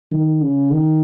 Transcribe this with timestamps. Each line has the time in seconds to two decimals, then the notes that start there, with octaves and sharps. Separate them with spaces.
0.11 D#3
0.41 C#3
0.71 D#3